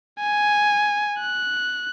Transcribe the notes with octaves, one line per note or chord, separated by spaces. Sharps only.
G#5
F#6